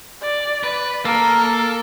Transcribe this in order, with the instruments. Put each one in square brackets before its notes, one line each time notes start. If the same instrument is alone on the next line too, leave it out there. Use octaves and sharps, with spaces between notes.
[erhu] D5
[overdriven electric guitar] B4
[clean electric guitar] A#3 [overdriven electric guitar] A4 [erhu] A#4